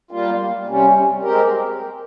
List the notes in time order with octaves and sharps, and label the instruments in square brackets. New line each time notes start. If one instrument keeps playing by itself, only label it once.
[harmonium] G3 A#3 F4
C3 G3 C#4
G#3 C4 G4 A#4